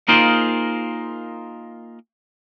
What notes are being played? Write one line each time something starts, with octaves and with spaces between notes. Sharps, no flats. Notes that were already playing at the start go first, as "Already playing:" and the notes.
A#3 D#4 F4 G#4 A#4 C5